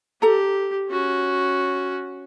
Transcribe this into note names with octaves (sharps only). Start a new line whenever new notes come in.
G4 A4 A#5
C#4 F#4